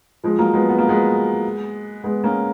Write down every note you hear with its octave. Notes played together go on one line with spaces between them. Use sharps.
F3 G#3
F#3 A#3
G#3 B3
B3
A#3
G#3 B3
G#3 B3
A#3 C#4